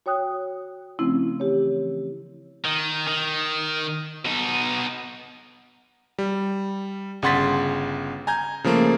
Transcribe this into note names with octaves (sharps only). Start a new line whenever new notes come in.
F#4 C#5 G5 D#6 F#6
C#3 F3 A3 C4 C#4 E4
E3 G4 C#5
D#3
D#3
B2 D#4
G3
G1 C#3 F#5 C6 A6 B6
G#5 A#5 G6 G#6
C#3 F3 A3 A#3